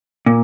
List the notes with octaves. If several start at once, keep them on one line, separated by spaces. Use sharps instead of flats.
A#2